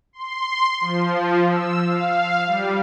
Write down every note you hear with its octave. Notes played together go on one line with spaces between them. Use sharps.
C6
F3
E6
F5
G3